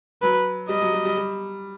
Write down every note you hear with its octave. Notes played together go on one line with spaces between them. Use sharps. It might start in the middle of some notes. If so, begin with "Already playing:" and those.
F#3 B4
G3 D#5
F#3
G3
G3
G3